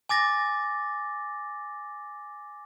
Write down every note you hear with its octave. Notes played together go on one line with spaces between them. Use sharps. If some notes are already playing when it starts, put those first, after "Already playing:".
G#5 D6 A6 A#6